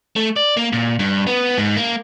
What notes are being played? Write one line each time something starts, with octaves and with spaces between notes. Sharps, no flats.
A3
D5
A#3
A#2
G2
B3
G#2
A#3